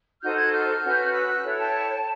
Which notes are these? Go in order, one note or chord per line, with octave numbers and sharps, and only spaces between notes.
D#4 F#4 A4 C5 F6 G6
F#6 G#6
F6 G6
C#4 F#4 B4
E6 F#6
E4 A4 C#5
G5 A5